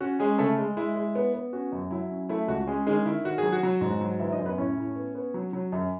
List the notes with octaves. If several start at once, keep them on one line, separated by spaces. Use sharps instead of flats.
C#4 F#4
G#3 C#4 G#4
C#3 A3 A4
G#3
G#3 E4
G#3
B3
B3
C#4 F#4
F#2
F#3 E4
C#4
A3 E4
C#2 F#4
G#3 C#4 G#4
D#3 G#3 G#4
D#3 E4
D#3 F#4
G#4
F#3
F#4
F#3
G#2
F#3
E3 E4 E5
D#4 D#5
F#2
B3 B4
A2 C#4 C#5
A2
B3
B3
F#3
F#3
F#2